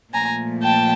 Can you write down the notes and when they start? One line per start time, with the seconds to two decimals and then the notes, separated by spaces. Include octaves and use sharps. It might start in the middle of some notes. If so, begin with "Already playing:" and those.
0.14 A#2 F3 A3 G#5 A#5
0.63 G5 A5